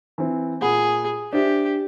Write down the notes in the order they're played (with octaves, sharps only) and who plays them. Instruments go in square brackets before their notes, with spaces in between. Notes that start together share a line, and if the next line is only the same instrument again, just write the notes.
[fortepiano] E3 C4
[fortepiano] A#2 F#5 B5 [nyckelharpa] G#4
[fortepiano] D4 C5 E5 [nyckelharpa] G4